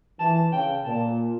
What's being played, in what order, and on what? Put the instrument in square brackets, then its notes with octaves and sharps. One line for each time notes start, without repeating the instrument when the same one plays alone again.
[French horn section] E3 [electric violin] A5
[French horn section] C#3 [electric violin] G5
[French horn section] A#2 [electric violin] A5